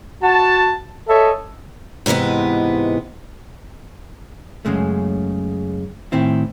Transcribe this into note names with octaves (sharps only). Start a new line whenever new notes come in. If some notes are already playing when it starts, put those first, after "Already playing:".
F#4 A5
A4 C#5 D#5 E5
G#2 C3 E3 G#3 B3
F#2 A#2 C#3 G#3 A3
A2 D#3 C4 E4